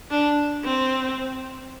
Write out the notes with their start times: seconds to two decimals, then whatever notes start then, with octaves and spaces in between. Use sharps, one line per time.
0.11 D4
0.64 C4